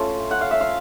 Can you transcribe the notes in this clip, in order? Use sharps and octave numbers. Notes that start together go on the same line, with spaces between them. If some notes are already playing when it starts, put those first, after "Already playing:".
Already playing: A3 C#4 F4 A5
F#5
F5
E5
F5